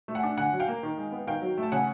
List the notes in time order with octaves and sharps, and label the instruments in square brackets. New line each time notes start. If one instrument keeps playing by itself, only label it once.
[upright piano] A3
F#5 G#5
D4
D3 F#5 G#5
F#3
F5 G5
A#3
D#3
G#3
B3
D#3 F5 G5
F#3
A3
A5
C#3 F#5 G#5